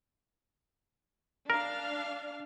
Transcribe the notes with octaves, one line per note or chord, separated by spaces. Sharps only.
D4 A#4 F5